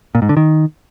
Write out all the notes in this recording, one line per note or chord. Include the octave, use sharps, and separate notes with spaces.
A#2
G#2
D3
D#3